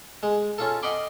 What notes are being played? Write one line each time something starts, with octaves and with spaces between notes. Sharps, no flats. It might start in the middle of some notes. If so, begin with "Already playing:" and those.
G#3
C#4 F4 A4
D#5 F#5 G5 B5 C6 D6